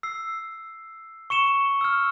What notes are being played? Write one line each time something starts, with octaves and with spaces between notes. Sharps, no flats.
E6 C7
C#6 C#7 E7 G7
E6 F6